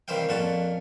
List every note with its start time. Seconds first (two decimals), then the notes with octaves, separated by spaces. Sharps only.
0.08 C2 D#3 E3 C5 F5 G5
0.29 F2 A#2 C#4 F#5 A5